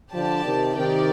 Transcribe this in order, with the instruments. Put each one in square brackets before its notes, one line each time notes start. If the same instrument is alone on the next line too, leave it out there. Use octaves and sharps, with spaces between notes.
[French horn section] D3 F3 [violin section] G4 D5 A5
[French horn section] C3 D#3
[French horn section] C3 D#3 [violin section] G4 A#4 D5 G5